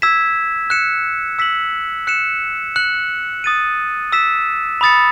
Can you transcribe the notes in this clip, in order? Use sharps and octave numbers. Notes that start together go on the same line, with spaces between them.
E6 G#6 B6 E7
F#6 C#7 E7
E6 B6 F#7
F#6 C#7 E7
F#6 C#7 F#7
D#6 A6 D#7
E6 B6 E7
B5 D#6 A6 C#7